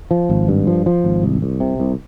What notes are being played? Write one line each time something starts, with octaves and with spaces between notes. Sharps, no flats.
F3
G#1
G2
F3
F3
G#1
C2
C2
C3
C2